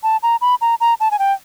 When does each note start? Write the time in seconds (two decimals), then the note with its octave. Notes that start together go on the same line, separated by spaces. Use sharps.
0.03 A5
0.23 A#5
0.41 B5
0.61 A#5
0.80 A#5
1.00 A5
1.11 G#5
1.19 G5